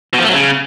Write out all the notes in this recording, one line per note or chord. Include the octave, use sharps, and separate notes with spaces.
B2
F3
A3
F#3
C#3